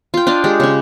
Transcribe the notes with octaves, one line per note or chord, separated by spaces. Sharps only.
F4 G5
D4 D#5 F5 C6
G#3 G4
C#3 C#4